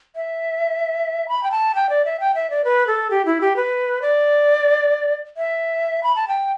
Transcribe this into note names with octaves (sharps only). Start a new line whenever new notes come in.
E5
B5
G5
A5
G5
D5
E5
G5
E5
D5
B4
A4
G4
E4
G4
B4
D5
E5
B5
A5
G5